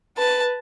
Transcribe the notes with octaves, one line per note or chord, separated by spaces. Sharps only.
B4 A5